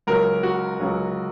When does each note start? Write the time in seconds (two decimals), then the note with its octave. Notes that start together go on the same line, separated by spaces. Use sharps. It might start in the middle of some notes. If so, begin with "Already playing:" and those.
0.07 C#2 C#3 F#3 A#4
0.43 F#4
0.80 C#2 C#3 F#3